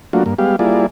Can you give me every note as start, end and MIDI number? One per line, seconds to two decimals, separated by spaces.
0.13 0.24 54
0.13 0.24 57
0.13 0.24 58
0.13 0.24 62
0.13 0.24 65
0.13 0.24 66
0.26 0.34 43
0.26 0.34 58
0.39 0.56 55
0.39 0.56 56
0.39 0.56 59
0.39 0.56 67
0.39 0.56 77
0.59 0.86 55
0.59 0.86 58
0.59 0.86 64
0.59 0.86 65
0.59 0.86 68
0.59 0.86 74